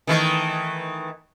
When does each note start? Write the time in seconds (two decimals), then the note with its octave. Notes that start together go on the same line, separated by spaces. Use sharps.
0.07 D#3 E3 A3